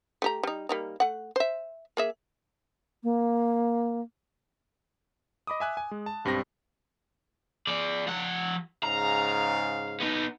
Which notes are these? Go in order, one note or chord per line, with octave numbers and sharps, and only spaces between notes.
A3 G4 A#5
G3 D#4
G3 A#3 D#4
A3 F#5
C5 E5
A#3 G#4 E5
A#3
D#5 B5 D6 D#6
E5 G#5 F#6
G#5
G#3
A5
B1 G2 G3 C4 A#6
G#4 D5
F3 F#5
G#2 C#3 F5 A#5
B3 D#4